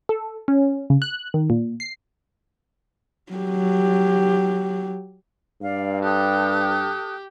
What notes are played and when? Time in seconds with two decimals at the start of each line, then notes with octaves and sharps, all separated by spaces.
0.09 A4
0.48 C#4
0.90 C#3
1.02 F#6
1.34 D#3
1.50 A#2
1.80 C7
3.32 F#3 G4
5.62 G2 D5 F5
6.03 G4 A4 G5 D#6 F#6